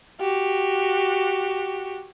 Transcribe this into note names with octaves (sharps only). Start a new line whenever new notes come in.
F#4 G4